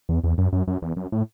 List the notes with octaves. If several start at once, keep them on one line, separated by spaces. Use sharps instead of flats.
E2
E2
F#2
F#2
F#2
E2
F#2
A2